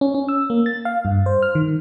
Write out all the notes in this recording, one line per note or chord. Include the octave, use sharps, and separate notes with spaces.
C#4
C#4
E6
A#3
A6
F5
G2
C5
F6
D#3